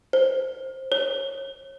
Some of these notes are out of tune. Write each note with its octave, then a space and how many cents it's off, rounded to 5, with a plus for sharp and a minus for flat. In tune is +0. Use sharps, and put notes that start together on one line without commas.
C5 +15
C#5 -30